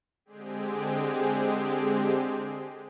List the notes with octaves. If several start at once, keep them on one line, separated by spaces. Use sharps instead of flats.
D3 G#3 C4 G4 G#4